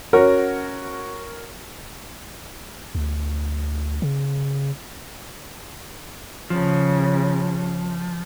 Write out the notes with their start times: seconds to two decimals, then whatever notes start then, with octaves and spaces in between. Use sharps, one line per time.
0.13 C#4 F#4 A#4 C#5
2.95 D2
4.02 C#3
6.50 C#3 F3